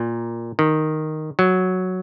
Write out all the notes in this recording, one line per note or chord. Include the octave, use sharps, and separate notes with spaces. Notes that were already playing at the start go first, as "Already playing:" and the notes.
Already playing: A#2
D#3
F#3